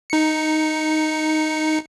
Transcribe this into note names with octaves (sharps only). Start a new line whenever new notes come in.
D#4 C#7